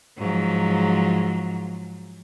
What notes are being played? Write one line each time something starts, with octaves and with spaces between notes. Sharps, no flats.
G#2 F3 F#3